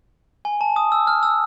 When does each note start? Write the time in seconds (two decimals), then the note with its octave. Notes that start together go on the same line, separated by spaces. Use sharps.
0.45 G#5
0.61 A5
0.76 D#6
0.92 E6
1.07 F6
1.23 E6